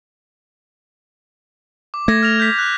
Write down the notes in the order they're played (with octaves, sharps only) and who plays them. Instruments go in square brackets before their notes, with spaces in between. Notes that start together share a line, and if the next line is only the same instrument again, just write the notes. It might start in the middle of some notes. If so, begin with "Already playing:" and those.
[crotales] D6
[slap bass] A3 [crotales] G#6 A#6
[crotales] F6 A#6 F7
G6 B6
F#6